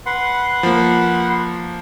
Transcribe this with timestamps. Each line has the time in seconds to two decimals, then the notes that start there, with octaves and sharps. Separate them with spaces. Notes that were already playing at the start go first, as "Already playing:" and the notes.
0.06 B4 F#5 C6
0.63 F3 A#3